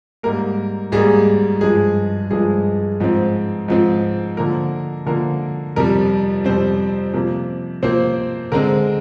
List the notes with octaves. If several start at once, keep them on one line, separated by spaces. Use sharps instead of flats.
G#2 G3 A#3 A#4
G#2 G3 A#3 G#4
G2 F3 G#3 G#4
G2 F3 G#3 G#4
G#2 F3 C4
G#2 F3 C4
D3 F3 A#3 A#4
D3 F3 A#3 A#4
F2 C3 G3 A#4
F2 C3 G3 C4 C5
C3 F3 A#3 A#4
C3 F3 A#3 C4 C5
D3 G#3 C4 A#4